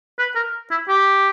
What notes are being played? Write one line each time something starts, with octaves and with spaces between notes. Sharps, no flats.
B4
A#4
E4
G4